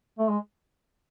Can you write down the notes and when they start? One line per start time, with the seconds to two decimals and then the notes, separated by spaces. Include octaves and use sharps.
0.19 A3
0.29 G#3